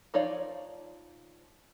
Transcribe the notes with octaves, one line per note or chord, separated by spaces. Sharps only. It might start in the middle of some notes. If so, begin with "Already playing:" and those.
F3 D#4 C#5 D5 F5